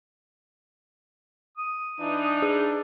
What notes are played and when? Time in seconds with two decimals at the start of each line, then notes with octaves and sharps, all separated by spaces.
1.58 D#6
2.00 E3 D4 D#4
2.42 G#4